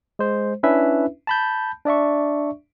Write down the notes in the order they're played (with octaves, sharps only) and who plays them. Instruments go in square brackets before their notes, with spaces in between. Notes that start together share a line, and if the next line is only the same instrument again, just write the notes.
[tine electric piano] G#3 C5
C#4 D4 E4 B4 E5
A5 B5 G6
D4 D5 E5 C#6